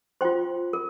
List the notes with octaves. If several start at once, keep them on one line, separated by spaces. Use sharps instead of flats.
F4 C5 G5 C6
A#4